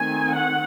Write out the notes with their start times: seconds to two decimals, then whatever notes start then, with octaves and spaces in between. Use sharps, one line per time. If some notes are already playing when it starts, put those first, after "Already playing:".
Already playing: D#3 A3 C4 G#5
0.35 F#5